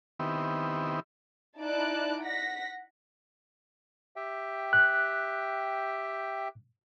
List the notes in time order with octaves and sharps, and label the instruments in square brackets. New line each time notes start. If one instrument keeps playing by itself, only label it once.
[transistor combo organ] D#3 B3 C4 E4 G4
[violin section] D#4 E4 D5 A5 F#6 D7
F#5 A#6 B6
[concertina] G4 E5 G5
[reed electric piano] F#6